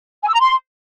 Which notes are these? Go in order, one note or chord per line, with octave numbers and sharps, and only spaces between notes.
G#5
E6
A#5
C6